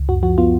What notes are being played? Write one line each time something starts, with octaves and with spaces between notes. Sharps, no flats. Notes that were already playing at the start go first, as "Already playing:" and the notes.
Already playing: C#2
F#2 F#4
F3 F#4
B3 F4